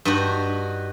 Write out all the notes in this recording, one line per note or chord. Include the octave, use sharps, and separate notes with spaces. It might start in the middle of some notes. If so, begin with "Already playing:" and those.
G2 D#4 F#4